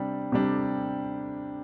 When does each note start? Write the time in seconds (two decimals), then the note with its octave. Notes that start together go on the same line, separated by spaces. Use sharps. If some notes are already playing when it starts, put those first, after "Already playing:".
Already playing: C3 G3 D4
0.32 C3 G3 D4